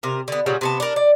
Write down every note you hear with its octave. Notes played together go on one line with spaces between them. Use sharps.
C3 A#4
D3 B3
A#2 C#3 F#3 G3
C3 B3 A5
D4 A#4
D5